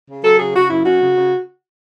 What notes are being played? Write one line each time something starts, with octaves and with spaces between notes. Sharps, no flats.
C#3
F#3 A4
C#3 G#4
C#3 F#4
F#2 E4
C#4 F#4
C#3
C#3